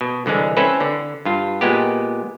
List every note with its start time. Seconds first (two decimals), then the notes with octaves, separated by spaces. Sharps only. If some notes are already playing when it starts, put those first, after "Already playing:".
0.01 B2
0.26 C2 D3 E3 G#3
0.57 C4 C#4 E4 A4 B4
0.80 D3
1.25 G2 F4
1.61 A#2 G#3 B3 G4